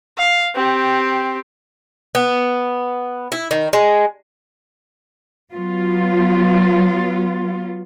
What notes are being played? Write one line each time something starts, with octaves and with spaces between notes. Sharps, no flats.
F5
C4 G4
B3
E4
D#3
G#3
F#3 B3 F4